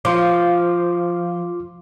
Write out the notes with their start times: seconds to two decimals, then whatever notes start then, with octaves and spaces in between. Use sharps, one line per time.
0.05 F3 F4 C6 D6